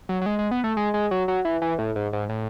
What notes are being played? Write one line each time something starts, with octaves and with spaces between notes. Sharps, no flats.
F#3
F#3
G#3
G#3
B3
A3
G#3
G#3
F#3
F#3
E3
E3
A2
G#2
G#2
A2